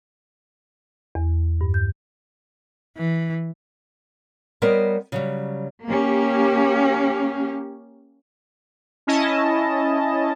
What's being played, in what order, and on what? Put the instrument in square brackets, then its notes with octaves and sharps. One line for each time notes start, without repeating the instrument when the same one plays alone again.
[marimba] E2
G2
G6
[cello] E3
[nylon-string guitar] G3 B3 A#4 C5 C#5 D#5
C#3 F#3 G3
[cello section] A#3 C#4 G4
[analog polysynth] C#4 E4 D#5 A5